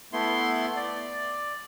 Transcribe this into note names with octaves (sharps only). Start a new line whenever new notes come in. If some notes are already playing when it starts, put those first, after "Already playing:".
A3 B3 E4 C6
D5